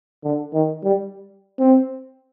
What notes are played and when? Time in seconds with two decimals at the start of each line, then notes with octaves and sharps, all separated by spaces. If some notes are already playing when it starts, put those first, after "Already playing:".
0.24 D3
0.54 D#3
0.84 G3
1.59 C4